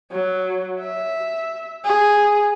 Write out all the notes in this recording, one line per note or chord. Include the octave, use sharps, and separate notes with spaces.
F#3
E5
G#4